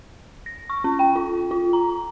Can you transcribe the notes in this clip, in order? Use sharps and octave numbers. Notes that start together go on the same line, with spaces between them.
A#6
C#6
C#4
G5
F4
F4
A#5